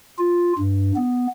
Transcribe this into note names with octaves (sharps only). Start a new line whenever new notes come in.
F4
G2
B3